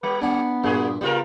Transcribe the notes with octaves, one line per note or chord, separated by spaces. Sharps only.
G3 B4
B3 D4 F#5 G#5
G2 A#2 A#3 F#4 G#4
C#3 G3 B3 F4 A#4